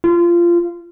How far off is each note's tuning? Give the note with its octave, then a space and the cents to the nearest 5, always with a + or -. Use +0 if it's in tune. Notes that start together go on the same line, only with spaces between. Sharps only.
F4 -20